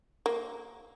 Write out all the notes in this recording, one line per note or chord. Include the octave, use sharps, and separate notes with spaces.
A#3